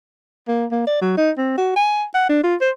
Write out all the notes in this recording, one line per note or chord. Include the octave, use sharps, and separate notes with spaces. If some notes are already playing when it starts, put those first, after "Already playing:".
A#3
A#3
D5
F#3
D#4
C4
F#4
G#5
F#5
D4
F4
C5